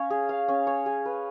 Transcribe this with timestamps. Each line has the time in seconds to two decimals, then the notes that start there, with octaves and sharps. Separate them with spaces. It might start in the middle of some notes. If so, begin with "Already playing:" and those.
Already playing: C#4 C#5 F5
0.10 G#4
0.29 F5
0.48 C#4
0.67 C#5
0.86 G#4
1.06 B4